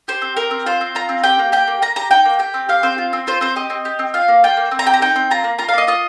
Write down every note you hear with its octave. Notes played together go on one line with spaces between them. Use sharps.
G4 C5
C4
G4 A#4
C4
F4 C5
C4
F4 A#5
C4
G4 G5
A#3
G4 G5
A#3
A#3 A#5
G4 A#5
D#4 G5
A#3
G4 G5
C4
G4 F5
C4 C5
F4
C4
F4 C5
C4 C5
G4 D#5
C4
G4
C4
F4 F5
A#3
F4 G5
A#3
C4
A#5
G4 G5
A#5
D#4 G5
C4
F4 A#5
A#3
F4 A#5
F5
A#3 D#5
F4 D#5